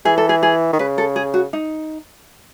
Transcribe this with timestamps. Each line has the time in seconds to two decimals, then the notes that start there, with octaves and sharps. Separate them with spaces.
0.05 E3 G#4
0.18 A4
0.29 G#4
0.43 G#4
0.73 D#3
0.79 C#3 B4
0.98 A4
1.16 G#4
1.34 F#4
1.53 D#4